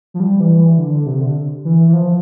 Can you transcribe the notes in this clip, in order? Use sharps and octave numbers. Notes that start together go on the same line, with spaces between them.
F3
G3
E3
E3
D3
D3
C3
D3
E3
E3
F3